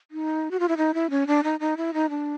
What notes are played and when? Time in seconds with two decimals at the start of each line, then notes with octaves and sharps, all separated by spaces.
0.11 D#4
0.51 F#4
0.60 F4
0.68 E4
0.77 D#4
0.94 E4
1.10 C#4
1.27 D4
1.44 D#4
1.60 D#4
1.77 E4
1.94 D#4
2.10 D4